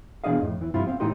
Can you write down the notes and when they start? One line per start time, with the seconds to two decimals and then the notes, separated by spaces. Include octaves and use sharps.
0.24 B2 E3 D4 G#4 D#5 F5
0.41 F2 A2
0.59 E2 E3
0.74 G2 C3 F3 E4 F4
0.87 C4 F5
1.00 C#2 A2 E3 D#4 G4 C6